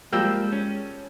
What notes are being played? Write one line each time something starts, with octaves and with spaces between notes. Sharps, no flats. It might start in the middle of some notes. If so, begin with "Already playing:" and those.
F3 G3 G#3 A#3 G5 E6 G6 E7
C#4